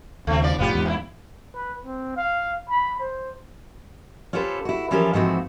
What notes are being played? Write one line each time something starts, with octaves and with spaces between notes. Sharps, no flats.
D#2 C#3 A3 C4
F3 D5
F1 A2 B3 F4 G4
E2 G#2
C3 E4
B4
C4
F5
B5
C5
C#4 F4 G4 A4 B4 C5
E4 F#4
E3 F3 C#4 G4 A4 A#4
G#2 E3 F3 A3 C4 F#4